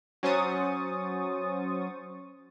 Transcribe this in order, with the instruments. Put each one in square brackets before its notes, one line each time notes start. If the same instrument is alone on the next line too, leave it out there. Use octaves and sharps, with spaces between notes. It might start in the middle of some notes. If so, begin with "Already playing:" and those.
[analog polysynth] F#3 C#4 C5 C#6 D#6 A6